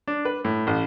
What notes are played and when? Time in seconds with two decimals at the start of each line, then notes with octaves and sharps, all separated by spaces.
0.08 D4
0.25 B4
0.45 A2
0.67 A1